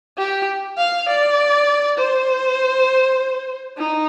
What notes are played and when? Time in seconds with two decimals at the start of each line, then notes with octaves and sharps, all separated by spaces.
0.18 G4
0.77 F5
1.08 D5
1.98 C5
3.77 D#4